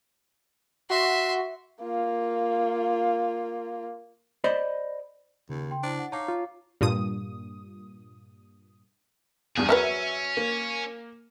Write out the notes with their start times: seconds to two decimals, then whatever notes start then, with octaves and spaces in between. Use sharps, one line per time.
0.90 F#4 E5 C6
1.82 A#3 F4
4.44 C5 D5 D#5 B5
5.50 D#2 C#3
5.71 G5 C6
5.83 D4 E4 C5
5.99 F#5
6.12 D#4 C#5 F5 A5 A#5 D6 C7
6.28 F4
6.81 G2 A#2 D#6
9.57 E2 G2 G#4
9.69 F#3 C#4 A#4 B4 E5
10.37 A#3